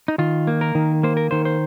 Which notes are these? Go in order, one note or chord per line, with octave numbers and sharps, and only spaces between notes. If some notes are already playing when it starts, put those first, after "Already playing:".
D#4
D#3 F4
A#3
A#4
D#3
A#3 C5
A#4
D#3 C5
C5